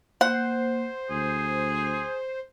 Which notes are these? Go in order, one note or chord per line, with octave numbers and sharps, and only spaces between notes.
A#3 C5 F#5
D2 G#4